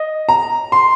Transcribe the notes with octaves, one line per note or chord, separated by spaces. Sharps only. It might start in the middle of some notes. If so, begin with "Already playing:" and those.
Already playing: D#5
A#5
C6